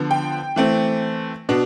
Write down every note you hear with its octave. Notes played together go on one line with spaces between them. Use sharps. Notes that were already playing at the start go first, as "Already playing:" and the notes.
Already playing: D3 F3 B3
G5
E3 A3 C4
B2 B3 D4